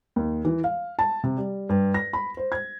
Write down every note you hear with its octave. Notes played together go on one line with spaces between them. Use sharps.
D#2
E3
F5
A5
C3
G3
G2
A#6
B5
C5
G#6